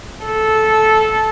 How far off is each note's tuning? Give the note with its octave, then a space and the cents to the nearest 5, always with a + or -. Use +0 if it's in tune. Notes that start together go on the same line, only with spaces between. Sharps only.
A4 -15